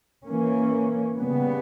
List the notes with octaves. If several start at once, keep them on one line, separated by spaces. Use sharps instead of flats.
E3 A#3 C#4
C#3 G3 B3